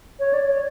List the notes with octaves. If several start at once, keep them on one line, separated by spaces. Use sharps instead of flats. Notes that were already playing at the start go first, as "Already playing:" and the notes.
C#5
D5
C#5